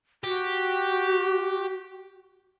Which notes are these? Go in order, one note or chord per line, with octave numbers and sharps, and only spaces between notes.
F#4 G4